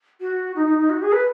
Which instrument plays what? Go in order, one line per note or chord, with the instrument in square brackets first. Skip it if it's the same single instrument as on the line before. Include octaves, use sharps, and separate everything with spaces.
[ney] F#4
D#4
D#4
D#4
F#4
G#4
B4